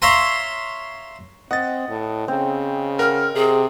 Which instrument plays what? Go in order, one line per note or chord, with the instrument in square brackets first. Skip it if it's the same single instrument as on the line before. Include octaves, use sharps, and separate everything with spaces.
[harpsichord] C#5 E5 F5 A#5 C6
[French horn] C4 [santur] D#5 [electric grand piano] F#5 A6
[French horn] A2
[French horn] C#3 [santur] C4
[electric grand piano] A#4 [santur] F#5 [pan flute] F6
[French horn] C3 [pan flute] G#4